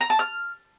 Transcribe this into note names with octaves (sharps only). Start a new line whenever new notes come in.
A#5
A5
F6